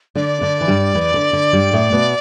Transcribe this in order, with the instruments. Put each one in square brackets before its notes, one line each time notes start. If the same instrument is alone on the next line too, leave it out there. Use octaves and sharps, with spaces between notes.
[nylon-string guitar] D3 D4 [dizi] D5
[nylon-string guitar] D3 D4
E3
G2 G3
E2 E3
D3
D3
G2 G3
A2 A3
B2 B3